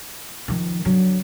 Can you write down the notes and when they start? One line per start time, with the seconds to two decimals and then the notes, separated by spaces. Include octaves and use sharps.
0.48 D#3 F3
0.85 D3 F#3